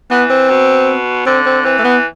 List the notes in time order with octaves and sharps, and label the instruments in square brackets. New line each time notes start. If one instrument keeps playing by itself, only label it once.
[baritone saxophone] E3 [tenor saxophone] B3
[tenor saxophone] C4
[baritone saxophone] B2
[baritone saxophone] D3 [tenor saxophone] C4
[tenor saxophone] C4
[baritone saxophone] E3 [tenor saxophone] C4
[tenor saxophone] A3
B3